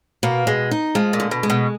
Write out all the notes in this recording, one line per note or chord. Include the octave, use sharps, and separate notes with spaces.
B2 A#3
B2 G#3
D#4
F3 G#3
A#2
D3
B2
G#3
B2